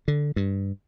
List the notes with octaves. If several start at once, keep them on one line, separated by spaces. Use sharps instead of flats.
D3
G2